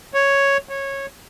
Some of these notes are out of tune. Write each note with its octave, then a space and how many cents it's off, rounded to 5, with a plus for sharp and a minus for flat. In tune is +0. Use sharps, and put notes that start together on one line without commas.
C#5 +0
C#5 -15